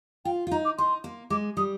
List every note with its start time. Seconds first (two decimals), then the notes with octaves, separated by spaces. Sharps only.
0.25 F4 G5
0.47 F4
0.51 D#4 A#5
0.65 D6
0.78 D#4 C6
1.04 A#3
1.30 G#3 D6
1.57 G3 D#6